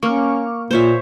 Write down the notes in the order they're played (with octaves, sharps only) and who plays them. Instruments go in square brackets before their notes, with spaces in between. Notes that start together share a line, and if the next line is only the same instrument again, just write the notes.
[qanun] A#3 [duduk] C#4 [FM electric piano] C#6 D6 F6
[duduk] A#2 [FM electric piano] A#3 F4 [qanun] C5 C#5 E5